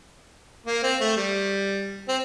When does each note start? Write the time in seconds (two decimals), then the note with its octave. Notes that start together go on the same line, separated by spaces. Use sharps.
0.66 A#3
0.83 C4
1.01 A3
1.17 G3
2.08 C4